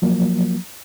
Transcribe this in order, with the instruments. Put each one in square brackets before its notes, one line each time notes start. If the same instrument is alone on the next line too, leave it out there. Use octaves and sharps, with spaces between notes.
[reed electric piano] F3 F#3 A#3